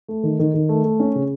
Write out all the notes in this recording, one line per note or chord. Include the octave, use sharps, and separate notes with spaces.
A3
D#3
D#3
D#3
A3
A3
C#4
C#3